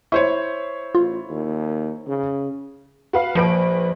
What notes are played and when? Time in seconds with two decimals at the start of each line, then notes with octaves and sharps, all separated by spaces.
0.12 E4 C5 C#5 C#6
0.95 A1 F4
1.30 D#2
2.07 C#3
3.13 F#4 B4 F5
3.35 A#1 F3 B4 D7